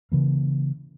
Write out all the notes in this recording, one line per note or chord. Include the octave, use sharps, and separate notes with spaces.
C#3 E3 A#3